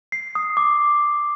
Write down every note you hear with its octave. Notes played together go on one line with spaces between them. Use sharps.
C7
D#6
D6